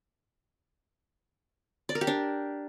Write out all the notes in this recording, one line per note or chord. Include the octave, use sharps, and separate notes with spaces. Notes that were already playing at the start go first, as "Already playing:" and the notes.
D5
A#4
G4
D4